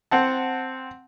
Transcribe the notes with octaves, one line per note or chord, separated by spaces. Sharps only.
C4 F#5 A5